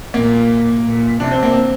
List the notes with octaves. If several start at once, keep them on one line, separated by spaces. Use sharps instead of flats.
A#2 A#3
A#2
C3 D4
C4
A#3
C4